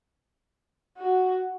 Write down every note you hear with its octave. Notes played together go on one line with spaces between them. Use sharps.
F#4